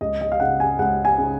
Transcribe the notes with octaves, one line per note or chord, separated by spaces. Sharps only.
C#2 D#5
D#5
F5
C#3 F#5
G#5
C#2 F#5
G#5
C#3